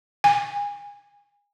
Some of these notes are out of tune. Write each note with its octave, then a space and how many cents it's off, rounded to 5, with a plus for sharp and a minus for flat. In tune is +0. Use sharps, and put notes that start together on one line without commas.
G#5 -30